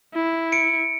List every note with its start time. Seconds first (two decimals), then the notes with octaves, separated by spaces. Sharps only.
0.13 E4
0.52 C#7 D7